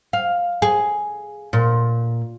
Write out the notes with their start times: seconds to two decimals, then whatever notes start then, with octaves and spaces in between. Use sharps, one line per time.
0.13 F5
0.62 G#4
1.53 A#2